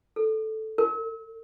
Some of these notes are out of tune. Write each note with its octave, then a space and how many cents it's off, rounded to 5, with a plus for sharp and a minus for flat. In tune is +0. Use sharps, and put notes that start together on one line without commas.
A4 -5
A4 +45